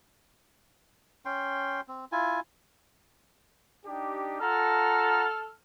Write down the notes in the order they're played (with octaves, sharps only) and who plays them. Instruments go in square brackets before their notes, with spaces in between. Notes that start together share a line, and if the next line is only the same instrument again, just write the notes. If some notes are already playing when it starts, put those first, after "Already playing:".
[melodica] C#4 G5 C6
C4
E4 F4 G#5
[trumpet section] D4 D#4 G4
[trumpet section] F4 F#5 A#5 [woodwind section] A4 F6